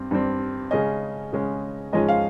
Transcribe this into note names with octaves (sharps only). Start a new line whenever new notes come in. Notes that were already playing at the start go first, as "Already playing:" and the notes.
Already playing: G2 C4
G2 G3 C4
C#3 G#3 C#4 D#5
C#3 G#3 C#4
G#2 F3 G#3 C#4 D#5
F5